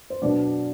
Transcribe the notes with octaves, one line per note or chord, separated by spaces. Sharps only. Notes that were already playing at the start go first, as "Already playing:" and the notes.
C5
B2 F#3 B3 D4 D5